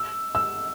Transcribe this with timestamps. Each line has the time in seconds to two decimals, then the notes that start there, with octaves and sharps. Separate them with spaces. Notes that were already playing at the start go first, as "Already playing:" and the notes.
Already playing: E6
0.35 E6